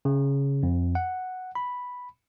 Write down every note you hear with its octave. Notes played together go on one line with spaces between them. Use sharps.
C#3
F2
F#5
B5